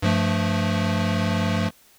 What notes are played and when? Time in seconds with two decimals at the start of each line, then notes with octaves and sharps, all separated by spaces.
0.02 G2 F3 A3